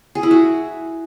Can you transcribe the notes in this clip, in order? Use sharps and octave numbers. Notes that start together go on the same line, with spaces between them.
G#4
E4
F#4